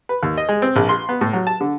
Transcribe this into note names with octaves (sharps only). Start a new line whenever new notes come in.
B4
D#2
D#5
G#3
C4
A#1
C6
B3
A2
F#3
A5
D3